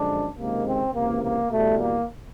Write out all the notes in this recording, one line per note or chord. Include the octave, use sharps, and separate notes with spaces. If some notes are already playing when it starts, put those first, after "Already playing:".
Already playing: F#2 D3 F3 G#3 D4
C#2 C3 D#3 G#3 A#3
C4
C#2 C3 E3 A#3
A#3
E2 B2 G3 A3
A#3